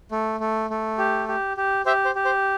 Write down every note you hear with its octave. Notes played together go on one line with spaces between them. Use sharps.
A3
A3
A3
G4
G4
G4
G4 C5 E5
C5
G4
C5